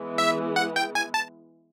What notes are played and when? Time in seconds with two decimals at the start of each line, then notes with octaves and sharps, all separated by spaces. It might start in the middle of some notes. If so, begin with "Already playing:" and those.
Already playing: E3 G#3 B3
0.18 E5
0.56 F#5
0.76 G5
0.95 G#5
1.14 A5